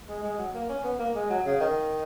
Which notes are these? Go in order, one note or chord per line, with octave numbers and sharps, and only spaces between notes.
G#3
G#3
F#3
A#3
C#4
B3
A#3
G#3
F#3
C#3
D#3